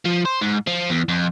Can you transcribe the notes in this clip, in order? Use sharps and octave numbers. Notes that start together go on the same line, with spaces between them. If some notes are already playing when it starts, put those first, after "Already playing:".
F3
C5
G#2
F3
E2
F2